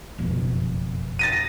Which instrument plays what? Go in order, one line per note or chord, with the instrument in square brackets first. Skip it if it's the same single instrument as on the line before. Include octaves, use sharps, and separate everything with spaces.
[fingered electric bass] F#1 F2 B2
[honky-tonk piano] A6 A#6 D#7